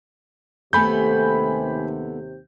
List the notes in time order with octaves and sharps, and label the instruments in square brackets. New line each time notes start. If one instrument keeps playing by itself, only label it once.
[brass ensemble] D#2 C3 [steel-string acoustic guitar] A3 B3 A4 [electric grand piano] G#5 B5 G6